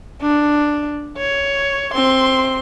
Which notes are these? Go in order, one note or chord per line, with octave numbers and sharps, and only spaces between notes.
D4
C#5
C4 C6